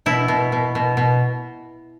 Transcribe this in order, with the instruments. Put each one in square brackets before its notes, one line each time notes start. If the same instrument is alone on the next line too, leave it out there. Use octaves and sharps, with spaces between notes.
[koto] B2 E4
B2
B2
B2
B2